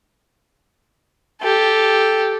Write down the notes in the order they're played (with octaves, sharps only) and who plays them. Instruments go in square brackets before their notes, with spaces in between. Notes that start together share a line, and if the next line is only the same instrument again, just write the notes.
[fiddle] G4 A4